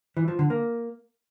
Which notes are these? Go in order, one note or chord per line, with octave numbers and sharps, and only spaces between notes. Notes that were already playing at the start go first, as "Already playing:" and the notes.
E3
F3
D3
A#3